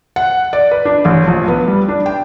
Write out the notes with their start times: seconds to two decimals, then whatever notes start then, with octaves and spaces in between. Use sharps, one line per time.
0.16 F#5
0.53 D5
0.71 B4
0.85 D4
1.05 A1
1.27 A#1
1.48 B3
1.68 G3
1.88 D4
2.06 G5